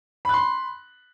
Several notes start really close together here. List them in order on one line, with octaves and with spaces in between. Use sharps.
B5 F#6 C6